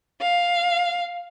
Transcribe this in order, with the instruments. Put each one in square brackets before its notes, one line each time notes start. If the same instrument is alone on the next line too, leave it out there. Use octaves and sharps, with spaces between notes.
[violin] F5